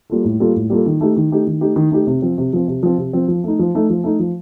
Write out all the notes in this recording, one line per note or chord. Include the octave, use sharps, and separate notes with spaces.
G3 A#3 F4 A4
A2
G3 A#3 F4 A4
A2
G3 A#3 F4 A4
D#3
A3 D#4 G4
D#3
A3 D#4 G4
D#3
A3 D#4 G4
D#3
A3 D#4 G4
C3
F3 C4
C3
F3 C4
C3
F3 C4
C3
F3 C4
F3
A3 D#4
F3
A3 D#4
F3
A3 D#4
F3